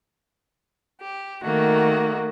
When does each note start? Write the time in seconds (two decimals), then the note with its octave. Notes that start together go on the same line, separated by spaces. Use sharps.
1.02 G4
1.43 D#3 A3 A#3 F#4